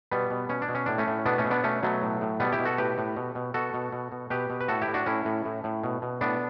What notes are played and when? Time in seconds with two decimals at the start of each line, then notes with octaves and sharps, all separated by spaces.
0.11 B2 G3 B3
0.30 B2
0.49 B2 C#4
0.62 D4
0.69 B2
0.75 C#4
0.86 A2 D4
0.98 A3 C#4
1.07 A2
1.25 B2 B3 D4
1.38 A3 C#4
1.45 B2
1.51 B3 D4
1.64 B2 A3 C#4
1.83 B2 F#3 A3
2.02 A2
2.21 A2
2.40 B2 G3 B3
2.53 E4 G4
2.59 B2
2.65 F#4 A4
2.78 A2 G4 B4
2.98 A2
3.16 B2
3.35 B2
3.54 B2 F#4 A4
3.74 B2
3.92 B2
4.12 B2
4.30 B2 G4 B4
4.50 B2
4.60 B4
4.68 A2 F#4 A4
4.82 E4 G4
4.88 A2
4.94 D4 F#4
5.06 A2 C#4 E4
5.25 A2
5.45 A2
5.64 A2
5.83 B2
6.02 B2
6.21 A2 B3 D4